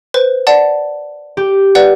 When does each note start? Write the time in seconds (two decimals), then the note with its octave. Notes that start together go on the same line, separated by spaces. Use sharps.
0.14 B4 C5
0.47 D5 F#5 A5
1.37 G4
1.75 B4 D5 F#5